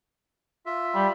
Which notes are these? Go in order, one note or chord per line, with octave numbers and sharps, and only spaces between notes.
F4 E5
G3